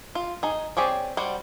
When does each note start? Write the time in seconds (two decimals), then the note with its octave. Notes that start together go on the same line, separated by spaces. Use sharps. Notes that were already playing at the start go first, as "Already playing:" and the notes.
0.15 F4
0.43 D#4 G#4
0.77 C4 G4 G#4 C#5 D5
1.17 G3 F#4 C5 G5